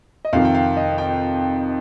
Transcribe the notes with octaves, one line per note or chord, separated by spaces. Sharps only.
D#5
F2 C3 D#3 F5
G5
F5
D#5
G5